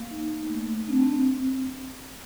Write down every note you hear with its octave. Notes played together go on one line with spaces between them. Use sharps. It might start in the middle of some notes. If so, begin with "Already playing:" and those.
Already playing: A#3
D#4
A3
C4 D4